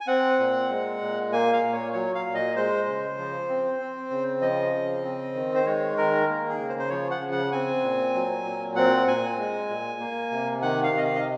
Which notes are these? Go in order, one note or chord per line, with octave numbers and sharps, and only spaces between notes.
G#5
C4 F#5
A#2
G#3
A#2
A#3 G#5
F5
A#2
C#5
F#3 C#5
F5
A#2
D#5
G#3 C5
C#3
F3
C4
C4
C#3
F3 D#5
C#3
C4
D#3
C5
G#3 C#5
D#3 A#4
A#3
G#4
C#3
C5
C5
F3 C#5
F#5
C#3
F#5
C4 G#5
A#2
F#3
A#2
C4 F#5
A#2 G#5
G#3
A#2
A#3
C3
D#3 F#5
F5
C3 D#5
F5
D#5